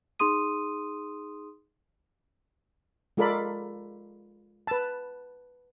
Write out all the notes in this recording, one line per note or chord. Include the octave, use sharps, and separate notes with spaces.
D#4 G#4 C6 D#6 D#7
G#3 F4 A4 A#4 D5 B5
B4 A5